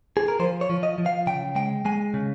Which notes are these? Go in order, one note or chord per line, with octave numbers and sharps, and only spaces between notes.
G#4
A#4
F3 C5
C#5
F3
D#5
F3
F5
C#3 G5
G#3 G5
G#3 G#5
C#3